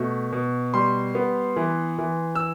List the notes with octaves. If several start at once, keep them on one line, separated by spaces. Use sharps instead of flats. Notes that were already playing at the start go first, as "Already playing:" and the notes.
Already playing: B2 A3
B2
G3 C6
B3
E3
E3
E6